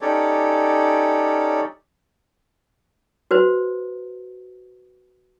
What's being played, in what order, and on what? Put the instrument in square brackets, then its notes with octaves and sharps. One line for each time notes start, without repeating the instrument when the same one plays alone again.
[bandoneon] C#4 D#4 G4 A4 C#5 D5
[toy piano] F#4 B4 C5